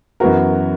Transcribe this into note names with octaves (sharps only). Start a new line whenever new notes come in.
F#2 E3 B3 F#4 A#4